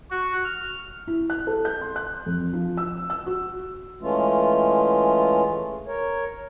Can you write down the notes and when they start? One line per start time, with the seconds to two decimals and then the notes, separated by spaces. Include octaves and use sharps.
0.10 F#4
0.45 F6
1.07 E4
1.30 F#6
1.47 A4
1.65 G6
1.81 C6
1.96 F#6
2.26 F2
2.53 F3
2.78 E6
3.10 E6
3.26 F#4
4.01 E3 G#3 A3 C#4 F4
5.87 A#4 C#5